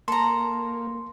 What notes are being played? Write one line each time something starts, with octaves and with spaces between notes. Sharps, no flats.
A#3 A4 A#5 C6